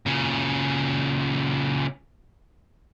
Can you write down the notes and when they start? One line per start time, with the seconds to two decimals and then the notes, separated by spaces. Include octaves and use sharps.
0.06 A#2 C#3